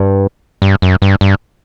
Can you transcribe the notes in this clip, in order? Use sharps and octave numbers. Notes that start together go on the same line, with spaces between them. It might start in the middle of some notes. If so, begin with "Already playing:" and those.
Already playing: G2
G2
F#2
G2
G2